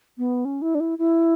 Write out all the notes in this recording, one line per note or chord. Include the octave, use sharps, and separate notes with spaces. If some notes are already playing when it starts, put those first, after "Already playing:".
B3
C#4
E4
D4
E4
E4